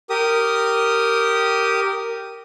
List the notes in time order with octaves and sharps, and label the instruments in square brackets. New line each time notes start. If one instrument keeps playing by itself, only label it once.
[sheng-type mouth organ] G4 A#4 D#6